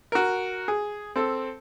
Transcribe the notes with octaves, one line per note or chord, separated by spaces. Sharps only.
F#4 A#4
G#4
C4 A4